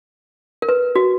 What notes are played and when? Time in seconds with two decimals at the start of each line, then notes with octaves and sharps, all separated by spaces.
0.62 A#4
0.69 B4
0.96 F#4